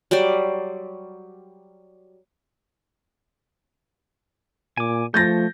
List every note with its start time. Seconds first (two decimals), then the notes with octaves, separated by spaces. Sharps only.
0.11 F#3 G3 C5 D5
4.77 A#2 G#5 D6
5.14 F3 A3 G6 A6 A#6